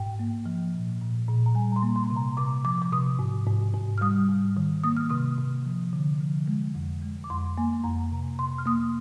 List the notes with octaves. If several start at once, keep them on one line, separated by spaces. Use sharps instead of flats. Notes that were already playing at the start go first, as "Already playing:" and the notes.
Already playing: G#2 G5
A#3
F3
A#2
A#2
A#2
A#5
G3 G#5
A#5
C6
A#3
C6
C3
A#5
C3 D6
F3 D6
D6
C3 D#6
G#2
G#2
G#2
F6
G3 D#6
G#2
D#3
A#3 D#6
F6
C3 D#6
C3
F3
D3
F3
G#3
F2
G#3
D6
F2 C6
A#3 G#5
F2 A#5
C3
C3 C6
F6
A#3 D#6